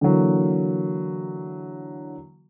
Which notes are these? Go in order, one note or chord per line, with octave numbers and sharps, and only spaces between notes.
D3 E3 F#3 A#3